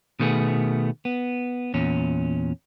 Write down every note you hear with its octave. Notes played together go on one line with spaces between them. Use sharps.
B2 D#3 A3 B3 G#4
B3
E2 A#2 C#4